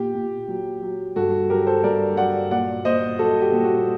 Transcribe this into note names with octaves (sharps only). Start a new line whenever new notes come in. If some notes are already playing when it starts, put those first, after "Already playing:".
Already playing: A#2 G4
A#2
F#3
F#3
G2 F#4 A4
F#3 G4 A#4
A4 C5
G2 A#4 D5
F#3 D5 F#5
A#2 D5 F#5
A#2 C5 D#5
F#3 F#4 A4
G4
A#2
F#4